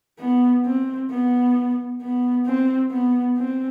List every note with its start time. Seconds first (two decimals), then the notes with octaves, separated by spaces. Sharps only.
0.19 B3
0.65 C4
1.11 B3
2.01 B3
2.46 C4
2.91 B3
3.37 C4